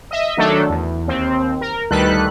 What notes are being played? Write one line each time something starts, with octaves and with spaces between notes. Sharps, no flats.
D#5 E5
D#3 F#3 A3 D4 A4
E2
D#2 C4
A#4
D2 D#3 G3 A4 B4 F#6